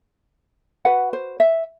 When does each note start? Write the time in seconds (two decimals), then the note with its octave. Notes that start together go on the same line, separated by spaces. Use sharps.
0.85 F#4 B4 F#5
1.13 C5
1.40 E5